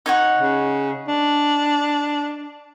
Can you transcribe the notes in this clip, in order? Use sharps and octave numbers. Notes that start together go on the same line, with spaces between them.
D#4 C#5 F#5
C#3
D4